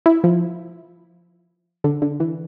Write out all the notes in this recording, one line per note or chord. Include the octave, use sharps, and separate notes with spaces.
E4
F3
D3
D3
E3